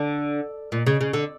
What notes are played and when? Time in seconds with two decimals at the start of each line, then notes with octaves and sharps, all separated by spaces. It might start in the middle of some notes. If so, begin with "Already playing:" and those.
Already playing: D3
0.72 A#2
0.87 C#3
1.01 C#3
1.13 D3